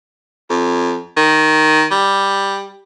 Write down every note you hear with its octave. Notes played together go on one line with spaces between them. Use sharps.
F2
D#3
G3